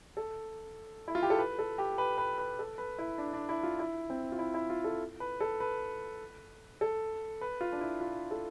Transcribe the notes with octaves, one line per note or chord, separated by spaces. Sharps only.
A4
E4
F4
G4
A4
B4
A4
G4
B4
B4
B4
A4
B4
E4
D4
D4
E4
F4
E4
C4
F4
E4
E4
F4
A4
B4
A4
B4
A4
B4
F4
D4
E4
F4
A4